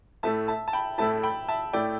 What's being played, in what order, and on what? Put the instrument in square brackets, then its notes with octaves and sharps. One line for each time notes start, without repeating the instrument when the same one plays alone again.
[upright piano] A2 A3 E4 [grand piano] E5 A5
[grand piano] E5 A5
A5
G5 B5
[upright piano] A2 A3 E4 [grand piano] E5 A5
[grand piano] G5 B5
E5 A5
[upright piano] A2 A3 E4 [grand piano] D5 G5